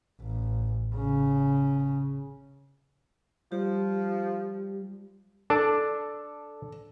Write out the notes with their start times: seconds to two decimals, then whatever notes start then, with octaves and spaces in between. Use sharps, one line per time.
0.21 A1
0.95 C#3
3.52 F3 G3 G4
5.50 D4 A4